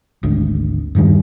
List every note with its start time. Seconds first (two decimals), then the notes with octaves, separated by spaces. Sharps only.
0.23 G#1 D2
0.95 E2 G2 D#3 G3